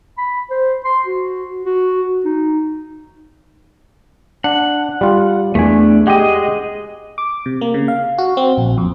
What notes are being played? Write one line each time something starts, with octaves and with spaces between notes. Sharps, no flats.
B5
C5
C6
F#4
F#4
D#4
D4 F#5
G3 F4
E2 A3 D4 G#5
G#3 G4 D#5 F#5
D6
C3
A#3
C#3
F5
F#4
C4
A#1
F2